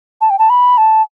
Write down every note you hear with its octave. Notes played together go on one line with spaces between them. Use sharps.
A5
G5
A5
B5
A5